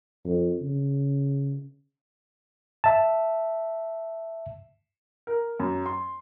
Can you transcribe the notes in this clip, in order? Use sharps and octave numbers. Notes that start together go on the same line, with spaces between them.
F2
C#3
E5 A5
A#4
F#2
C6